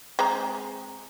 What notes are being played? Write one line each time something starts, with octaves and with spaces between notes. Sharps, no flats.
G#3 C4 A#5